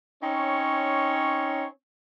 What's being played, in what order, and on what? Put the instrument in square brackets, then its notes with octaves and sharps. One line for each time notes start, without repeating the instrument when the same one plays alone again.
[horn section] C4 C#4 D#4 C#5